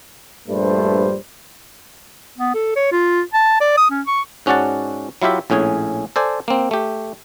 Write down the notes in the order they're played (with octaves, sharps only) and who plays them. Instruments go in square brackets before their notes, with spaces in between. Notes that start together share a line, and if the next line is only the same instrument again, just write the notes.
[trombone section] A#1 G2 G3 A3 B4 C5
[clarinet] B3
A4
C#5
F4
A5
D5
D#6
C#4
C#6
[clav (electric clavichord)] G#2 C#4 F#4 D5 F#5 A5
F#3 E4 F4 G4 E5
A#1 A2 C#4 G#4 G#5
A4 C5 D5 G#5
A#3 C4
A3 G4